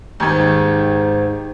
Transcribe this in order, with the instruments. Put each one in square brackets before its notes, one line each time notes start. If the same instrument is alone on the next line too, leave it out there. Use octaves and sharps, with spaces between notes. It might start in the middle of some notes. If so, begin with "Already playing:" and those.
[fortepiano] D#2 D#3 [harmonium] G#2